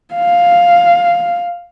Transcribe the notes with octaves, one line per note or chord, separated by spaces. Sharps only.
F5